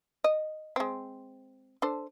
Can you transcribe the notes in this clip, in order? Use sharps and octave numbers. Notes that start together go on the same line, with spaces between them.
D#5
G#3 C4
D4 A4 C5